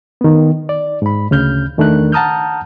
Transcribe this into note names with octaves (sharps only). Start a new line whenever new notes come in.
D#3 B3
D5
G#2 B5
D2 C#3 F6 G6
E2 D#3 A3 D4 A#4 F#6
F#5 A5 A#5 D#6 F6 G6